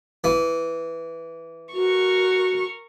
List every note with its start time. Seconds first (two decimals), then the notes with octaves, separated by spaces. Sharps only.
0.24 E3
1.73 F#4 A#4 C#6